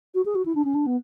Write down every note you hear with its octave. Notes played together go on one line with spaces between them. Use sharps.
F#4
G#4
F#4
E4
D4
C#4
D4
B3